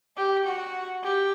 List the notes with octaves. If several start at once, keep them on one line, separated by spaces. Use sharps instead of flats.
G4
F#4
G4